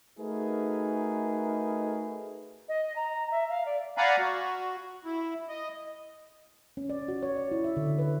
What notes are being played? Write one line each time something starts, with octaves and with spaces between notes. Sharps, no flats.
A3 D#4 F#4 G#4 A#4 B4
D#5
A#5
E5
F5
D5
D5 F5 F#5 G#5 A#5 B5
F#4
E4
D#5
C#4
D5
F#4
C#5
D5
E4
E5
D3
B4